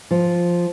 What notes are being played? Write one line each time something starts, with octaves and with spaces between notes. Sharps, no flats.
F3